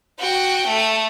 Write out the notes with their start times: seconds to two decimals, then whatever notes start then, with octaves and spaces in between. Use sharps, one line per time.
0.19 F#4 G5
0.66 A3